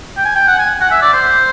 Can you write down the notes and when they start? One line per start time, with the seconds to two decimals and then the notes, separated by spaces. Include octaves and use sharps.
0.17 G5
0.25 G#5
0.35 G5
0.47 F#5
0.58 G#5
0.81 F#5
0.91 E5
1.02 D5
1.13 C5